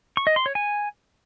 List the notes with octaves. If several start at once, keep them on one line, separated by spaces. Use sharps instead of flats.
C#6
D#5
C6
C#5
G#5